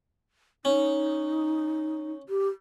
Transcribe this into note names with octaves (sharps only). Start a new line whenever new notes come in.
C#4 D#4
G4